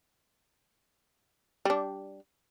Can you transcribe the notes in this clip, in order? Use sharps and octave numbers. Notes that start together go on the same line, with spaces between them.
G3 D4